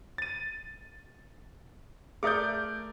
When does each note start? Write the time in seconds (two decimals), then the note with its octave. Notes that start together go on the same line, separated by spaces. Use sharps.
0.18 A6 D#7
2.23 A3 G#4 A#4 D5 E5 D6 D#6 G6